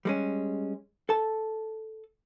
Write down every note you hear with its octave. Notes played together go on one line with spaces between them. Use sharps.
G3 G#3 C#4
A4 A5